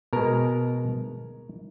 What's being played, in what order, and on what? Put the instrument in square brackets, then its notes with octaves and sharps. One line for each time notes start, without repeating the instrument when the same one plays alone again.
[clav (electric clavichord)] B2 G#3 A#4